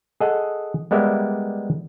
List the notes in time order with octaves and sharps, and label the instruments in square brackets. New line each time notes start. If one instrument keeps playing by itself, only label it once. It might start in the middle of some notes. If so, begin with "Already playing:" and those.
[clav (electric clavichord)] G#4 A4 D#5 F#5
G3 G#3 B3 A#4 D5 E5